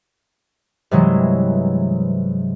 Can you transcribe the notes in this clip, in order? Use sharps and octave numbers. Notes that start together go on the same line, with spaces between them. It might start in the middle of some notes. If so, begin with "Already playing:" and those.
G2 C3 E3 F#3 G#3